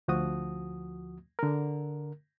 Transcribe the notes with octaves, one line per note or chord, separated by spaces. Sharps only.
D2 F3 F#4 D#6
D3 A#4